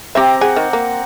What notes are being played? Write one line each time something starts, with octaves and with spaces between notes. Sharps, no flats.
C4 G4 E5 A#5 D6
G#4 F#5
D#3
A#3